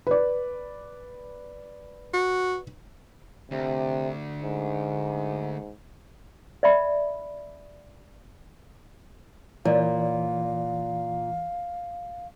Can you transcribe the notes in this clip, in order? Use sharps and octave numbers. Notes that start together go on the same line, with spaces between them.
B4 D5
F#4
D2 C3
G#2
D5 E5 B5
A#2 E3 C#5 D5 F5